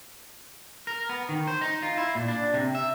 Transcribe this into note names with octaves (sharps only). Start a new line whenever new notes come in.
A#4
B3
D#3
C5
D#4
F4
E4
A#2
D4
C3
E5